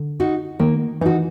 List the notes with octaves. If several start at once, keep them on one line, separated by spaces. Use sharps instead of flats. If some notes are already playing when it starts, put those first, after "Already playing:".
Already playing: D3
D#4 F#4
D#3 A#3
E3 D#4 F#4